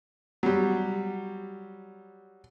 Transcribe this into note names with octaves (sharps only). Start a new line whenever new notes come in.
F#3 G3